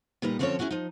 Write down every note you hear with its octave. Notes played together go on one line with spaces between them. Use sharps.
A#2 G3 D#4 B4
D3 F3 C4 C#4 A4 C#5
C#4 D#4 E4 F#4 G#4
F3 D#4